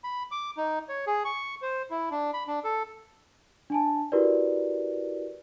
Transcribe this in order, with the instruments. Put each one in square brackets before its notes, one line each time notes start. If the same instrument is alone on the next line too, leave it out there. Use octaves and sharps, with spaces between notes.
[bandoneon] B5
D6
D#4
C#5
G#4
C#6
C5
E4
D4
B5
D4
A4
[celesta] D4 G#5 A5
E4 F#4 G4 A#4 B4 D5